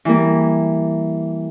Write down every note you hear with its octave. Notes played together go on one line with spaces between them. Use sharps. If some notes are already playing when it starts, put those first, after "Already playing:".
E3 G3 A#3